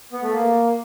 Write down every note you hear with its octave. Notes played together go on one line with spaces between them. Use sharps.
B3
A3
A#3